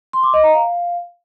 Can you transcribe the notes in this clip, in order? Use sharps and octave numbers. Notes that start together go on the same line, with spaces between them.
C6
D6
D#5
A#5
F5